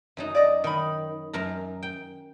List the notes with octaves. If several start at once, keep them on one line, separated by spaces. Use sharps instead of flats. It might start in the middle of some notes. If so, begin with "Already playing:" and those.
F#2 F#3 D#4
D5 D#5
D#3 D#4 B5
F#2 A#4 A#5
G5